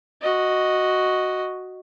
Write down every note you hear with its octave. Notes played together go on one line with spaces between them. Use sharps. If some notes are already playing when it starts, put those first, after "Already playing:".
F#4 D#5